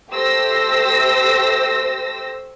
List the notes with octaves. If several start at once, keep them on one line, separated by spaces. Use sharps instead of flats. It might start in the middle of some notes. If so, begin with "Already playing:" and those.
A3 G4 C5 E6 A#6